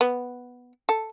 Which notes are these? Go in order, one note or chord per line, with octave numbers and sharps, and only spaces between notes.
B3
A4